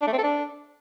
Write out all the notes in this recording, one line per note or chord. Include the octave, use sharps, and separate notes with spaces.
D4
A3
C4
A4
D4